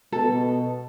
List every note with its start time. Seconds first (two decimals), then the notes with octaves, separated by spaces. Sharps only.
0.12 B2 A4